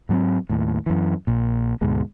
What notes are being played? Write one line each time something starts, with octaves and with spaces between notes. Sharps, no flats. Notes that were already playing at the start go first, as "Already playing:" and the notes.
G#2 F#3 B3 C4
D#2 A2
F#2 E3
A#1 A#2
D2 G#2 B2 G#3